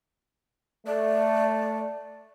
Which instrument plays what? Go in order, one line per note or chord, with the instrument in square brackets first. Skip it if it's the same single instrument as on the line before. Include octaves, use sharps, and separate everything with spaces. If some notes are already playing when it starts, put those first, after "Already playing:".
[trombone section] A3 [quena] D5